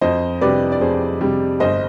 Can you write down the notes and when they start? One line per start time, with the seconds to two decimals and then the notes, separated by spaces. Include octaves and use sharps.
0.01 F2 C5 D#5
0.41 C3 G3 B4 D5
0.72 D5
0.81 F2 G#4 C5
1.21 C3 G3
1.60 G1 C5 D#5